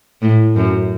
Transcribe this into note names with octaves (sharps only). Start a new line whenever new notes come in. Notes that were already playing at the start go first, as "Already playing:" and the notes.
A2
F#2